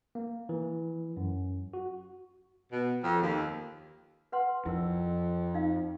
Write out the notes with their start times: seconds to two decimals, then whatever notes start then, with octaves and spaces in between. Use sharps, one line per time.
0.15 A#3
0.49 E3
1.17 F#2
1.74 F#4
2.72 B2
3.03 F2
3.21 D#2
4.32 B4 F#5 C6
4.66 F2 E4 A#4
5.54 D#4 F5